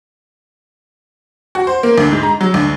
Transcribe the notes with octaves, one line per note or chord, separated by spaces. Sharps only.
F#4
C5
A#3
D2
G#2
A#5
F#3
D2